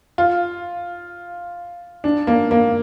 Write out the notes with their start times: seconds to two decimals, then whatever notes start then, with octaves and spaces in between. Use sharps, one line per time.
0.18 F4
2.04 D4
2.27 A#3
2.51 A#3